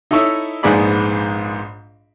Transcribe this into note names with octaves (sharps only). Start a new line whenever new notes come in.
D#4 E4 A4 C#5 D#5 E5
A#1 G#2 B3 G#4 D5 B5